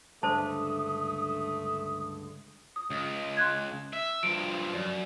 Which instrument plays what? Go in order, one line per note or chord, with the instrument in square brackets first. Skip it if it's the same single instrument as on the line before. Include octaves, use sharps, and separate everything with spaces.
[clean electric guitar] C#2 G2 D3 [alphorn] A3 [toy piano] C5 A5 [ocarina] D#6
[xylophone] D#6
[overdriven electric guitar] C#2
[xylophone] C6 F#6 G#6
[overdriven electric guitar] E5
[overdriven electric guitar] G2 F3 [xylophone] D7
[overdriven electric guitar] F#2 [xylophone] D5